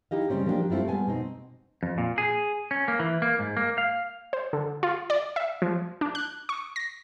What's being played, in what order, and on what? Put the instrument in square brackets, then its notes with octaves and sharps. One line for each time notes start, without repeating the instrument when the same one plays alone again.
[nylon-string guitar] D#4 E4 G4 D#5 F5
C#3 F3 G3 C4 C#4
F3 A#3 B3 D4 D#4 G4
A3 C4 E4 F4 G4
G3 G#3 B3 G#5 A5
B2 C4 D#4
[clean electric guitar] F2
A#2
G#4
C#4
A#3
E3
A#3
G#2
A#3
F5
[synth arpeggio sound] C5
D3
F4
D5
E5
F3
D4
F#6
C#6
A#6